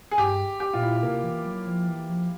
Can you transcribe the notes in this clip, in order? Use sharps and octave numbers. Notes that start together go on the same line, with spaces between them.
G#4
G2 G4
G4
A#2 F4
E4
C3 A#3
E3
F#3
F3
E3
F3